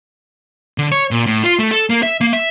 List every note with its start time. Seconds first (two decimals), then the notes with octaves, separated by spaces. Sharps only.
0.78 D3
0.92 C#5
1.11 A#2
1.26 A2
1.44 F4
1.59 A3
1.72 A4
1.90 A#3
2.03 E5
2.21 A#3
2.33 E5